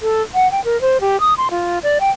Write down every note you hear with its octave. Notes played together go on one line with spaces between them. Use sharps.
A4
F#5
G5
A#4
C5
G4
D#6
C6
F4
D5
G5